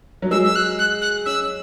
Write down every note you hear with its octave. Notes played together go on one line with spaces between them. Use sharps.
F#3
G#3 E6
E6
F#6
F#6
F#6
C#4 E6